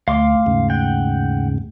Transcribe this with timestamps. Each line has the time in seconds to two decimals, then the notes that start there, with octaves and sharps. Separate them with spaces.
0.08 D2 A3 F5 C6 D6
0.46 D#2 G#2 C#3
0.70 F#5 G5